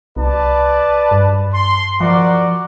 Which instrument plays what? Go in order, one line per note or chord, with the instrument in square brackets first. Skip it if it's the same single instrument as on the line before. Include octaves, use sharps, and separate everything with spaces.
[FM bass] C2 [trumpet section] B4 D5 A5
[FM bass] G2
[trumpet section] C6
[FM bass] F3 [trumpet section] F#4 A#4 D5